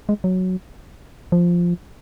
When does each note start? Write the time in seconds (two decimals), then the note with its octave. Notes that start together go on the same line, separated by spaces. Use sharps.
0.09 G#3
0.24 F#3
1.32 F3